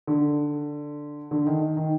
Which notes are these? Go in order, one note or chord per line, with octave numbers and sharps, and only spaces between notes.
D3
D3
D#3
D#3
D#3